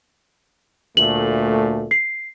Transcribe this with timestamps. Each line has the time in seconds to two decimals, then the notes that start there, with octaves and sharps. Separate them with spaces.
0.97 D2 A#2 A3 F#7
1.91 C7